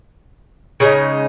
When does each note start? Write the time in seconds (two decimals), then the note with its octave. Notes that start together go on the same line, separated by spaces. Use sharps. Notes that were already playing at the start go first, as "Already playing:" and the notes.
0.80 C#3 G#3 D#4